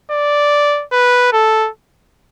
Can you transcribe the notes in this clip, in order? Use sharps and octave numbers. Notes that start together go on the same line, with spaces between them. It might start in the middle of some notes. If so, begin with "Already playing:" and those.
D5
B4
A4